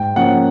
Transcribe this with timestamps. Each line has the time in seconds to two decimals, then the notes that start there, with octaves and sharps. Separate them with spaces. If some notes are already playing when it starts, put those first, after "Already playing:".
Already playing: G#2 G5
0.16 F3 A#3 C#4 F#5